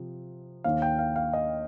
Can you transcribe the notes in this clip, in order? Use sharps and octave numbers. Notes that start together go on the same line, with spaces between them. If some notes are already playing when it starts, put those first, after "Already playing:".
Already playing: C3 F3
D#2 D#3 F5
G5
F5
F5
D#5